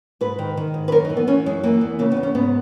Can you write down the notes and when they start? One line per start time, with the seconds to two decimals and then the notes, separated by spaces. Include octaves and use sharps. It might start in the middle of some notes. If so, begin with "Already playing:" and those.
0.21 G#2 B4
0.39 D#3
0.57 D#3
0.74 G#2
0.88 B4
0.92 F#2 A#4
1.05 D#4
1.10 E3
1.17 B3
1.27 E3 C#4
1.46 F#2 G#3
1.63 E3 A#3
1.81 E2
1.99 C#3 A#3
2.11 B3
2.17 E2
2.23 C#4
2.35 G#2 B3